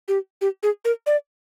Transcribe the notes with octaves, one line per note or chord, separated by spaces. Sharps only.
G4
G4
G#4
A#4
D5